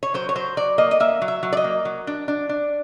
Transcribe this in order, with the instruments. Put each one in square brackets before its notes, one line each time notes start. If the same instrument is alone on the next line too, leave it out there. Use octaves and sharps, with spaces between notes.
[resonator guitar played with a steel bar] C#5
F#3 C5
C#5
F#3 C5
F#3 D5
A#3 D#5
D#5
A#3 E5
F#3
E5
F#3
D5
D#5
A#3
F#3
D4
D4
D4